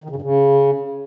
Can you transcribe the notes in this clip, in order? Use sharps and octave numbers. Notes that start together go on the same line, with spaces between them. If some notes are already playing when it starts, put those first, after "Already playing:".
D#3
C#3
G2
C#3